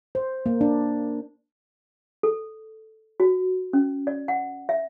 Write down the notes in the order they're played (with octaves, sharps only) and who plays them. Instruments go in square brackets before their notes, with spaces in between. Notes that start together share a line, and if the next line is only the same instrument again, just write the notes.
[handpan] C5
A#3
D4
[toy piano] A4
F#4
C#4
D5
F#5
E5